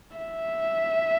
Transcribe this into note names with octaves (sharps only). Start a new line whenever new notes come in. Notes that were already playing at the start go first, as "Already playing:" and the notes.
E5